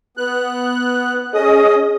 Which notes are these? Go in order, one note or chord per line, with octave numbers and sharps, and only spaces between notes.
B3 F#6
C#4 G#4 D#5 D#6